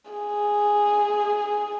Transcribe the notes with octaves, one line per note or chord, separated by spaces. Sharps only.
G#4